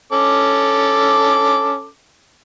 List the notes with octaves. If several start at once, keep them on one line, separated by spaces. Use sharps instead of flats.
C#4 A4 D6